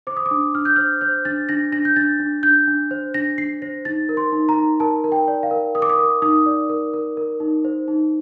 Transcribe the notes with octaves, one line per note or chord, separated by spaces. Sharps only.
C5 D6
D#6
D6
D4
D4 F6
G6
C5 F6
C5 G6
D4 A6
D4 A#6
D4 A#6
G6
D4 A6
D4
D4 G6
D4
C5
D4 A#6
D4 C7
C5 A#6
D#4 A6
A#4
C6
D#4
A#5
D#4
A#4 A5
A#4
G5
D5
F5
A#4
A#4 D#6
D6
D#6
A#4
D#4 D#6
D5
A#4
A#4
A#4
D#4
C5
D#4